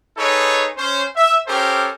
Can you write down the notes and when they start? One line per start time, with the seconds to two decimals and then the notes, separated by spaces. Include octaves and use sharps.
0.17 D#4 G#4 A4 B4 C#5
0.76 C#4 C5
1.15 E5
1.47 C#4 G4 A4 A#4 C5